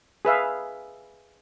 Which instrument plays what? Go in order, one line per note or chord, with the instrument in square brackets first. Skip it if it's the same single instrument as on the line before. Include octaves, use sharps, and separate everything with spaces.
[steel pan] G#4 B4 E5 F5